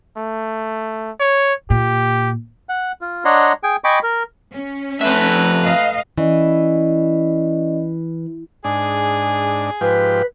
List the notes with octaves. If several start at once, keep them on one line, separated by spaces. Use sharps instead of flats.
A3
C#5
A#2 G4
F#5
F4
D4 C#5 D#5 F#5 A#5 C6
G#4 G5 G#5
D#5 G5 G#5 B5 C#6 D6
A#4
C#4
F2 A3 B4 E5 A#5
D#5 F5
E3 C#4 D5 D#5
G#2 D4 G#4
G#2 F3 G4 B4